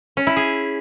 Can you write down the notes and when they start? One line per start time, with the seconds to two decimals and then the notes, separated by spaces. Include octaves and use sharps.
0.17 C#4
0.27 E4
0.37 G#4